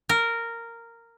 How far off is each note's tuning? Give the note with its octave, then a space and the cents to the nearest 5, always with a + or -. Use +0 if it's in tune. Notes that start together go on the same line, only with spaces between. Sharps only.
A#4 -10